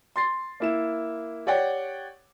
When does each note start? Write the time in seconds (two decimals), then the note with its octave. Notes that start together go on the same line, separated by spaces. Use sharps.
0.16 C6 A6 C7
0.60 A#3 E4 E7
1.46 G4 C#5 D5 F#5 G5